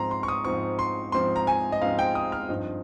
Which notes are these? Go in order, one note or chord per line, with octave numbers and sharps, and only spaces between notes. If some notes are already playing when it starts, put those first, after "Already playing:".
Already playing: G#2 F3 C4 A#5 C6
C6
C#6
D#6
G#2 F3 C4 C#6
C6
G#2 F3 C4 C6
A#5
G#5
D#5
G#2 F3 C4 F5
G5
D#6
F6
G2 F3 C4 D#4